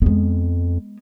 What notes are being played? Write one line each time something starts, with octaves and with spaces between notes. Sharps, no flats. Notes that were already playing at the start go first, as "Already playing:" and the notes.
F2 G#3 B3